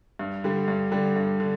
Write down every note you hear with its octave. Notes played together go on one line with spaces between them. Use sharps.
G2
D3 G3
G2
D3 G3
G2
D3